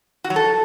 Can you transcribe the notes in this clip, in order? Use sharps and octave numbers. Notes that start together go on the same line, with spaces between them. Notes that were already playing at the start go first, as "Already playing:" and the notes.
F#4
F#3
A4